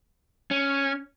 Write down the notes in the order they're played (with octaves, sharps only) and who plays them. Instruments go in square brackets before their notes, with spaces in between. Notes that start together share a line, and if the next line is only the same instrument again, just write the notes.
[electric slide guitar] C#4